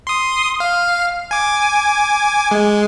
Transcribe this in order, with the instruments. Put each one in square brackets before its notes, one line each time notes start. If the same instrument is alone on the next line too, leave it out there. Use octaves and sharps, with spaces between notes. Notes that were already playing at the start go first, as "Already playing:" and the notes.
[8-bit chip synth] C6 D#6
F5
G#5 D6
G#3